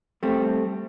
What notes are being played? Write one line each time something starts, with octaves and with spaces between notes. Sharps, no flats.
G3 A3 C4